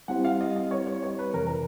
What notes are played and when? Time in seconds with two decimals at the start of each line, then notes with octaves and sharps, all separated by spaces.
0.08 G3 C4 E4 G4 C5 F#5
0.25 F5
0.41 D#5
0.56 D#5
0.71 C#5
0.87 C#5
1.03 C#5
1.19 B4
1.34 F2 C3 E3 A#4
1.47 A#4